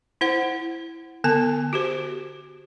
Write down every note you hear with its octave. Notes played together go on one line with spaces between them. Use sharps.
E4 C5 F#5
D3 B3 G#5
F#4 G4 C5